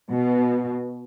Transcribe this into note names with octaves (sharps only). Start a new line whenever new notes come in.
B2